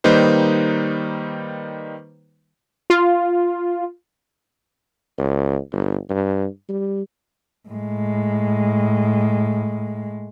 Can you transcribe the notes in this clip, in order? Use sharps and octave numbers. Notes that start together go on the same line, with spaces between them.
D#3 G3 A#3 D#4 B4 C5
F4
C#2
G1
G2
G3
A2 G#3